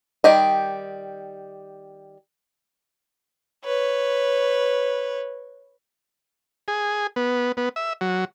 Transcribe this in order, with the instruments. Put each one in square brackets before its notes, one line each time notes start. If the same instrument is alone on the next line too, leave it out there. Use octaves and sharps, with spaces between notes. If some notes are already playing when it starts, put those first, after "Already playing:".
[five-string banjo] D#3 G3 G4 D#5
[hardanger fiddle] B4 C#5
[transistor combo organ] G#4
B3
B3
E5
F#3